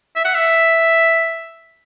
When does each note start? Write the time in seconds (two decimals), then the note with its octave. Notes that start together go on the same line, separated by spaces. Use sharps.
0.16 E5
0.25 F#5
0.34 E5